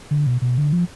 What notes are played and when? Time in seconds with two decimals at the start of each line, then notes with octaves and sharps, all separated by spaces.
0.11 D3
0.26 B2
0.42 B2
0.58 D3
0.73 F3